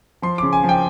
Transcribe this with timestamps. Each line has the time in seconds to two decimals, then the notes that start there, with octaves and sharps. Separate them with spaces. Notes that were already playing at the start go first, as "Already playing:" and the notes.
0.22 F3 C6
0.38 C#3 D6
0.53 G#5
0.63 F3
0.69 G5